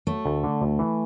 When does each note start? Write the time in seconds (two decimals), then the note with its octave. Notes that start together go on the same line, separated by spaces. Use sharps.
0.07 F#3 A3
0.26 D2
0.44 D3
0.61 D2
0.79 E3